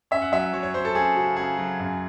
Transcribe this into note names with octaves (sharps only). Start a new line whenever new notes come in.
C#4 E5
F#5
F#3 E5
F#3 C#5
C#5
F#3 C5
A4
C#4 G#4
C#3 F#4
C#3 G#4
F#3
F#2